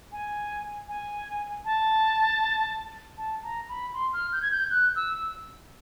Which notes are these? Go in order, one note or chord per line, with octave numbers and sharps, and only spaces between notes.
G#5
G#5
A5
A5
A#5
B5
C6
F6
G6
G#6
G6
F#6
E6